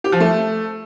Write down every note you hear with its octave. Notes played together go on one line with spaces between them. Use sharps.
G4
F3
A3